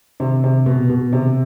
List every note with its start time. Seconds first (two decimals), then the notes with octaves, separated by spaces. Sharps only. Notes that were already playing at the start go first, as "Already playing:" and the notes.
0.20 C3
0.44 C3
0.66 B2
0.89 B2
1.13 C3